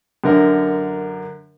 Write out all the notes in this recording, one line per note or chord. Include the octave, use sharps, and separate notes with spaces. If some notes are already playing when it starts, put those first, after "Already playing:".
F#2 D3 A#4